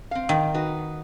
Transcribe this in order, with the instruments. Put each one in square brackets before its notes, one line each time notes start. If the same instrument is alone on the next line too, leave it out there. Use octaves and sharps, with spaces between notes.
[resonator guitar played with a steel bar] C4 F5
[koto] D#3
[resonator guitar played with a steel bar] D#4 F#4 B4